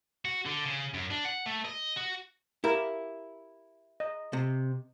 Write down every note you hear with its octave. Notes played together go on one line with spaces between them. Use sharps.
F#4
D3
C#3
F#2
D4
F#5
A3
D#5
F#4
E4 G4 A#4
D#5
C3